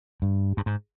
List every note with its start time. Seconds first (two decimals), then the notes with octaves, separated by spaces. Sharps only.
0.22 G2
0.57 G2
0.66 G#2